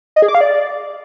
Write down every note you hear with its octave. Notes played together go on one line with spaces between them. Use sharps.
D#5
G#4
D6
F5
D5